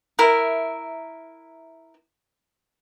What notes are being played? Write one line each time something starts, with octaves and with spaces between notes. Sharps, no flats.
E4 A#4 E5